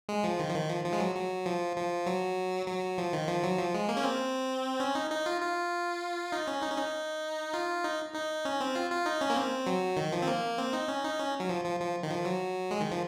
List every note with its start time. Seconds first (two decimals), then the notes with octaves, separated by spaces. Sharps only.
0.09 G#3
0.24 F3
0.39 D#3
0.49 F3
0.55 D#3
0.69 F3
0.85 F3
0.93 G#3
1.00 F#3
1.15 F#3
1.46 F3
1.76 F3
2.06 F#3
2.67 F#3
2.98 F3
3.13 D#3
3.28 F3
3.43 F#3
3.58 F3
3.74 G#3
3.89 A#3
3.97 C#4
4.04 C4
4.80 C#4
4.95 D#4
5.11 D#4
5.26 F4
5.41 F4
6.32 D#4
6.48 C#4
6.62 D#4
6.70 C#4
6.78 D#4
7.53 F4
7.84 D#4
8.14 D#4
8.45 C#4
8.61 C4
8.75 F4
8.91 F4
9.06 D#4
9.21 C#4
9.30 A#3
9.36 C4
9.67 F#3
9.97 D#3
10.12 F3
10.22 C4
10.28 A#3
10.58 C4
10.73 D#4
10.88 C#4
11.04 D#4
11.18 C#4
11.40 F#3
11.49 F3
11.64 F3
11.80 F3
12.03 D#3
12.11 F3
12.25 F#3
12.71 G#3
12.81 D#3
12.91 F3